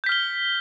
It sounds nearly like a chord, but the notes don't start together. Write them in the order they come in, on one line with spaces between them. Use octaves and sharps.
G6 B6 F6 G7